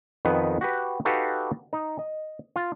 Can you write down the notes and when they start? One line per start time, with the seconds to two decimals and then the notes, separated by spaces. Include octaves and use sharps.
0.25 F2 D#3 B3 B4
0.61 F#4 G4 B4
1.05 D#4 F#4 G4 A4 B4 F5
1.73 D#4
1.99 D#5
2.56 F4